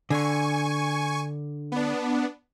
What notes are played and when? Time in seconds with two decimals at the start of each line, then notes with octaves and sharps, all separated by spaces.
0.10 D3 G#5 C#6
1.72 B3 D4